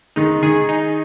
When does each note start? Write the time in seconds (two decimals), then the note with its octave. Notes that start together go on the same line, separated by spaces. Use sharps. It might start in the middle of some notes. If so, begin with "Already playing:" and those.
0.16 D#3 G#3 D#4
0.43 D#3 G#4
0.69 D#4